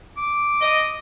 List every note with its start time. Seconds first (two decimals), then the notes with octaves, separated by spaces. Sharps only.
0.17 D6
0.60 D#5